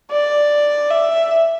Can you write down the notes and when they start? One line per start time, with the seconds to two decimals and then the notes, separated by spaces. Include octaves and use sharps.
0.12 D5
0.90 E5